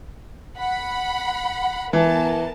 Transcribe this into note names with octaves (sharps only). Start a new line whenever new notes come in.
F#5 B5
E3 B3 A#4 A5